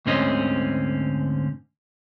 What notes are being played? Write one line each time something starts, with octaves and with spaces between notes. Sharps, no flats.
D2 G#2 D3 C4 C#4 D#5